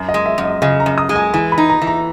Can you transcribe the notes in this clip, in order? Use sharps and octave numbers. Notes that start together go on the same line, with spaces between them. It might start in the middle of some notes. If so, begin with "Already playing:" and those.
Already playing: F#2
D#5
G#3
E5
F#2
D#5
C#3 D#5
A#5
F#2
D#6
G#3
G#5
E3 G#5
B5
D#4
A#5
E3
A#5